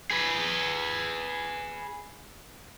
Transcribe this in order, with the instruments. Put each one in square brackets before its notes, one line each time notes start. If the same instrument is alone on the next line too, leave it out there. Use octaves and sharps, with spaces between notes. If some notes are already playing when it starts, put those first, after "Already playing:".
[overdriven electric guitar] G#4 B4